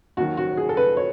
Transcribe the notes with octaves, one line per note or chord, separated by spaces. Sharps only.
D#2 D#3 F#3 F#4
F#4
G#4
A4
B4
C#5